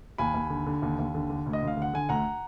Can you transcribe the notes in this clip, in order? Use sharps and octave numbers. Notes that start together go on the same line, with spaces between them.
D#2 G#5 B5
D#2
D3
D3
D#2
D#2
D3
D3
D2
D#5
D2
F5
D3
F#5
D3 G#5
D2 F#5 A#5